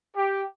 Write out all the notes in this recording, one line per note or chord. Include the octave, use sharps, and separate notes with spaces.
G4